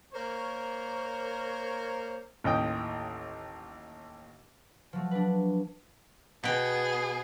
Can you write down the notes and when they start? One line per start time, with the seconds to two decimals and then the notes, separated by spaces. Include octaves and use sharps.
0.13 A#3 A#4 C5 C#5
2.44 A1 D#2 D#5 G5
4.93 F3 F#3 A3
5.11 D4 B4
6.44 B2 B3 G#4 G5